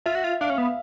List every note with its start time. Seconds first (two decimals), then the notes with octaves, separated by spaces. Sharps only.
0.06 F4 E5
0.15 F#4
0.24 F4
0.41 D4 F5
0.50 C#4
0.58 B3